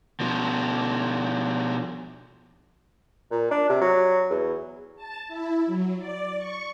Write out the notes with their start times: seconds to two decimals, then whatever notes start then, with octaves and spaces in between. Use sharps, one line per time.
0.20 B2 F3
3.31 A#2
3.51 D4
3.69 C3
3.81 F#3
4.30 E2
4.96 A5
5.28 E4
5.66 F#3
5.99 D5
6.38 C#6